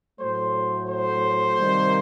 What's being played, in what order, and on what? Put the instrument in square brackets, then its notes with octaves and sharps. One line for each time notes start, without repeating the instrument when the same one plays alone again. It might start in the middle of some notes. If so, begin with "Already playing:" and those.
[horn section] A2 F#3 A3 C5
C5
C3 D#3 G3 A#3